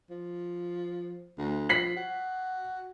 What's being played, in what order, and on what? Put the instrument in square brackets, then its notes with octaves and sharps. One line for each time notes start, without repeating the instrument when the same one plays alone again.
[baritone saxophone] F3
D2
[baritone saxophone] F3 [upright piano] B6 C7 F#7
[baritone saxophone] F#4